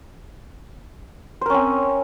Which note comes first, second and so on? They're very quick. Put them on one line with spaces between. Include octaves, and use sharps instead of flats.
C5 A#4 C#4 C4